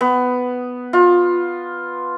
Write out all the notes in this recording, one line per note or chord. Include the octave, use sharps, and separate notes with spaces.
B3
F4